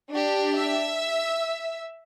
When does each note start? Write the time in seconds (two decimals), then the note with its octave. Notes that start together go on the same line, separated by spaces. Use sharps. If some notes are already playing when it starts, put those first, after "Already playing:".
0.11 D4 G4
0.56 E5